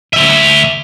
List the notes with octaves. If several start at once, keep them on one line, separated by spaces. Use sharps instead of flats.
D2 E5